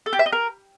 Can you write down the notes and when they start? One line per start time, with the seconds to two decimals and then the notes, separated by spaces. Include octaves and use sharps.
0.06 A4
0.13 G4
0.19 E5
0.26 D#5
0.32 A#4